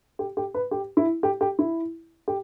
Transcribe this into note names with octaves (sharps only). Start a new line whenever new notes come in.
G4
G4
B4
G4
E4
G4
G4
E4
G4